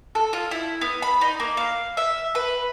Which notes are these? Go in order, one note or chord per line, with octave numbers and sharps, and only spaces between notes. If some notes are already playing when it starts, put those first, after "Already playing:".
A4
F4
E4
B3
B5
D#4
A#3
F5
E5
B4